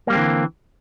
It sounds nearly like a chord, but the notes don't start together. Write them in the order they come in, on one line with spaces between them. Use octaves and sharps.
A#3 G3 C4 D3 E3